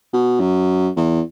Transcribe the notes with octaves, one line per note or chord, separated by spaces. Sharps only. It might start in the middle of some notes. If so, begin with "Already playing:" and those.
B2
F#2
E2